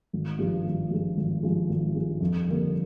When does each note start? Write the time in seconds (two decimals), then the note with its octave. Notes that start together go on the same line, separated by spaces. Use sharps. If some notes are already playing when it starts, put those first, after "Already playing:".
0.13 G#1
0.39 G2 F3 G#3
0.65 G#1
0.90 G2 F3 G#3
1.17 G#1
1.43 G2 F3 G#3
1.69 G#1
1.95 G2 F3 G#3
2.21 F2
2.47 D3 G3 A#3